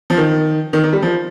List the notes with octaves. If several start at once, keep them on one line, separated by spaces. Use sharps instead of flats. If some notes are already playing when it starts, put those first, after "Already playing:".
F3
D#3
D#3
D#3
G3
F3